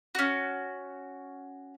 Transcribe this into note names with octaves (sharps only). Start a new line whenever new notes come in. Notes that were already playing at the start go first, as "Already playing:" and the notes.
C#4 F#4